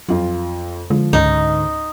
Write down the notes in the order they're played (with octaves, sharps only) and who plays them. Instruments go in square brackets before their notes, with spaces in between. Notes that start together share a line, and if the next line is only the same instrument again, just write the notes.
[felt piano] F2 F4 [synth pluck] F#3
[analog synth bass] D3 [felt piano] F3 [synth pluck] G#3
[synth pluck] C#2 C#4 [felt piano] G#2 [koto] D#4